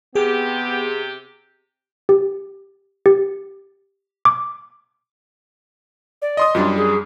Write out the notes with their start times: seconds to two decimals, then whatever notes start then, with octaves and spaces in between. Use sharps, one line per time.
0.15 C3 B3 G4 G#4
2.09 G4
3.06 G4
4.25 D6
6.22 D5
6.37 D#5 C6 D#6
6.55 F#2 G3 D4 F4
6.77 G#4